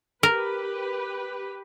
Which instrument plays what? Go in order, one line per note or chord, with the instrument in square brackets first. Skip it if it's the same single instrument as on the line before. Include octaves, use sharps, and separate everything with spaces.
[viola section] G4 B4 [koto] A#4